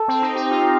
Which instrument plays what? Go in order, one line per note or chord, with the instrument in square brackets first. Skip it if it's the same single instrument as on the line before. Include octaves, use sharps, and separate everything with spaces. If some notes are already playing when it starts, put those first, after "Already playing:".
Already playing: [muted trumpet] A4
[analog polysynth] C4
D#4
[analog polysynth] D#4 [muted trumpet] G4
[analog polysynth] F4